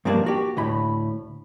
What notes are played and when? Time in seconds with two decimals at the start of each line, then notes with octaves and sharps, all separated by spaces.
0.05 G2 F3 A#3 D4
0.26 F#4 G4
0.57 D2 A2 B5